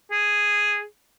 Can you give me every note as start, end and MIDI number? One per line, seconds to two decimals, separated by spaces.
0.12 0.83 68